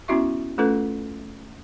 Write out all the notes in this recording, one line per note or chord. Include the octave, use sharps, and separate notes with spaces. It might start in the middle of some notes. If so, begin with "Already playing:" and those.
B3 C#4 E4 F#4 E5 C#6
A3 C#4 F4 A4 B4